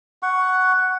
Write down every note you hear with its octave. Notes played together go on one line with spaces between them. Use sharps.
F#5 C#6